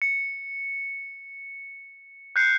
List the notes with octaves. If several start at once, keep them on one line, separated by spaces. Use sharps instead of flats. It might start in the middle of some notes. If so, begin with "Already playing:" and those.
C#7
F#6 G6 C7 C#7